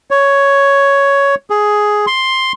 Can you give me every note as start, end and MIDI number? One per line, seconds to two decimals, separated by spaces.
0.11 1.35 73
1.50 2.06 68
2.07 2.52 84